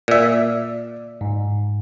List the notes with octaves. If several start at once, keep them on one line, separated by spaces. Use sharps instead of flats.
A#2 D5 E5
G#2